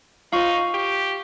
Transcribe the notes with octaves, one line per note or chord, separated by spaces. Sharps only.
D#4 F4 C5 F5 C#6
G4